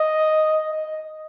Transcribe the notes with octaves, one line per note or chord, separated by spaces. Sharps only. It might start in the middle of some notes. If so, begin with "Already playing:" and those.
Already playing: D#5
D#5